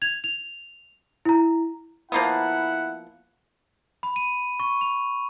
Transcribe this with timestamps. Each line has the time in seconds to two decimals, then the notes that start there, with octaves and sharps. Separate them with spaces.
0.02 G#6 F7
0.24 F7
1.25 E4 A#5
2.12 F3 A#3 B3 E4 F#5
4.03 B5
4.16 D#7
4.60 C#6
4.81 F7